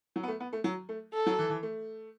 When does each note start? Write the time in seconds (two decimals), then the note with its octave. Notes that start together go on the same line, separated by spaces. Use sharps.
0.16 F#3
0.23 B3
0.28 A3
0.40 B3
0.53 A3
0.64 F#3
0.89 A3
1.14 A4
1.26 F#3
1.38 E3
1.50 E3
1.63 A3